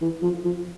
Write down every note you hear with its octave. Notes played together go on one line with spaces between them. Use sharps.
E3
F3
F3